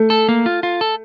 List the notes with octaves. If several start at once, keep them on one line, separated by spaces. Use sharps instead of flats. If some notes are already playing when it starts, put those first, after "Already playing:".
Already playing: A3
A4
A#3
F4
F4
A4